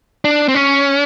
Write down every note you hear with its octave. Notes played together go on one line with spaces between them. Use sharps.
D4
C4
C#4